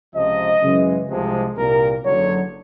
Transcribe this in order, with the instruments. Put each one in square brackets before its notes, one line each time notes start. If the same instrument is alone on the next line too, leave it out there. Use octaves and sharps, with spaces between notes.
[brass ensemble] C#2 C3 F3 D#5
F#2 C#3 E3 G#3
C2 C3 F3 G#3
C2 A#2 G3 A#4
F#1 F#2 D3 F#3 C#5